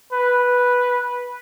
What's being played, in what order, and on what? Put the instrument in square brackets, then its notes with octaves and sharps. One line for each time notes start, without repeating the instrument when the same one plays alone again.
[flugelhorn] B4